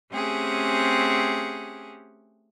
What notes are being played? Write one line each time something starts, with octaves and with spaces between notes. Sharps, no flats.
A3 C4 C#4 G4 G#4 F#5